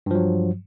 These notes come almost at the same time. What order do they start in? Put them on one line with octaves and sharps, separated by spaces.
G2 F3 F#3